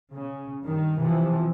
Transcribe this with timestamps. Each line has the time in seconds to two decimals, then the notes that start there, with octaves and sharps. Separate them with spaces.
0.12 C#3
0.63 G2 D#3
0.99 C3 E3 F3